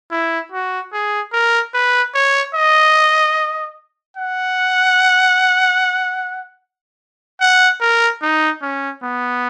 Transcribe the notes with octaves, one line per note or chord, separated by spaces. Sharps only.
E4
F#4
G#4
A#4
B4
C#5
D#5
F#5
F#5
A#4
D#4
C#4
B3